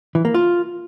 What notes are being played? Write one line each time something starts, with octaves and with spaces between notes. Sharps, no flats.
E3
A#3
F4